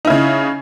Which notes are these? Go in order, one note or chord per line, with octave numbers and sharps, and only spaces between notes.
C#3 D#4 E4